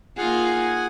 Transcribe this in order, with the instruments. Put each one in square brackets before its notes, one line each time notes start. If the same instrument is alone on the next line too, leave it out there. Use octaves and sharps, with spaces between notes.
[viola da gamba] A#3 D#4 F4 [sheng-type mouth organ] G#4 F#5 G#5